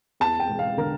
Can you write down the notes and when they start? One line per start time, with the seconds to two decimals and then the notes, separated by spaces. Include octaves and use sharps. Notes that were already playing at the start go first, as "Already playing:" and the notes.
0.20 E2 A5
0.40 G5
0.50 E1
0.59 F5
0.77 D3 A#4